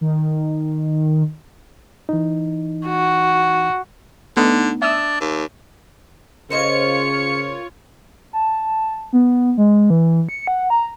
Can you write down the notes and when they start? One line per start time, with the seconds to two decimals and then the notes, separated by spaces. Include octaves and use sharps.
0.01 D#3
2.09 E3 D#4
2.87 F#4
4.37 D3 A3 B3 D#4
4.82 D4 E5 D#6 E6
5.21 D#2
6.50 C#3 F4 A#4 C5 C#5 D#5 C#7
8.33 A5
9.13 B3
9.58 G#3
9.90 E3
10.29 C#7
10.47 F#5
10.70 A#5